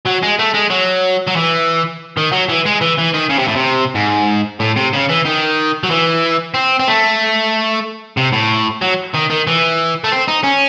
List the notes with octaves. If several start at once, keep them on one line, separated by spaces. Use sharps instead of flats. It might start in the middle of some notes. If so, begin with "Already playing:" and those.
F#3
G#3
A3
G#3
F#3
F#3
E3
D#3
F#3
E3
G#3
E3
E3
D#3
C#3
C3
A2
C3
G#2
A2
C3
C#3
E3
D#3
F#3
E3
C4
C4
A3
C3
A2
F#3
D#3
D#3
E3
A3
C4
D#4
C#4